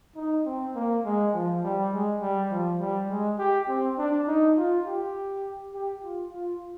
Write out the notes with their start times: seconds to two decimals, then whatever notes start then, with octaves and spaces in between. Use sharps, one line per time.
0.16 D#4
0.46 C4
0.75 A#3
1.05 G#3
1.34 F3
1.64 G3
1.93 G#3
2.21 G3
2.51 F3
2.80 G3
3.10 G#3
3.39 G4
3.68 C4
3.98 D4
4.28 D#4
4.57 F4
4.86 G4
5.74 G4
6.03 F4
6.33 F4